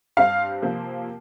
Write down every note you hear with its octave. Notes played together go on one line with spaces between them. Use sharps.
G2 G3 C4 F5
C3 F3 A#3